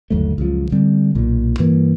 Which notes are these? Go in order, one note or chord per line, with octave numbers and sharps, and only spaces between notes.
G1 D#2 F#3 A3
C#2 F#2 F3
D3 G3 C4
B1 A#2
G2 E3 A#3